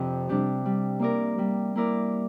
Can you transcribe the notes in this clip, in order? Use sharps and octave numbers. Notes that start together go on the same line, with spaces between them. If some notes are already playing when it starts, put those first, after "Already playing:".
Already playing: F2 C3 D4 G4
C3 G3 D4 G4
G3
A#3 E4 A#4 D5
G3
A#3 E4 A#4 D5